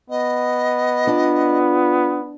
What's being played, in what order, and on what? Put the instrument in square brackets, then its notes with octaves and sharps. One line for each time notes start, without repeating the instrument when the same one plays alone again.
[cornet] B3 [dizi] D#5
[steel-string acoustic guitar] D4 [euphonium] F4